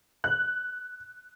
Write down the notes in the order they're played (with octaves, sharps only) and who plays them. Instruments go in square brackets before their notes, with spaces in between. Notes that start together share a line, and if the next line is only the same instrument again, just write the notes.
[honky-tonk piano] F#6